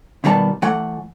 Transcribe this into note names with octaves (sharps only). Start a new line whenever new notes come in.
B2 D#3 G3 B3 A5
E3 A3 F#5